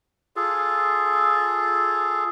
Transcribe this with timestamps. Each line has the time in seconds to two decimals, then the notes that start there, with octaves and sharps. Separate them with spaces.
0.36 F4 G#4 A4